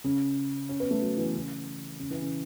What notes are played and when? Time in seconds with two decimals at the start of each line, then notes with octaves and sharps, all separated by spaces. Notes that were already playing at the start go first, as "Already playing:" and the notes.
0.04 C#3
0.69 C#4
0.80 B3
0.91 A3
1.01 F#3
1.17 E3
1.34 C#3
1.99 C#3
2.11 E3
2.21 C#3